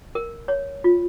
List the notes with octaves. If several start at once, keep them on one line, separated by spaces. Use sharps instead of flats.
A#4
C#5
F4